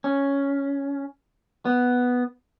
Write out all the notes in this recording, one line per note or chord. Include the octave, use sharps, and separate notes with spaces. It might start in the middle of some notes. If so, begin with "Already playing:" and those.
C#4
B3